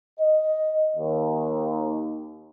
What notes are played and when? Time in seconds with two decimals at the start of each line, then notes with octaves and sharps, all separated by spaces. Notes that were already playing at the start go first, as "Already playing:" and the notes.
0.20 D#5
0.97 D#2